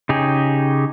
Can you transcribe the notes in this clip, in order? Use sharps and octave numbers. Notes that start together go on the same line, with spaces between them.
C#3 D#4 G4 G#4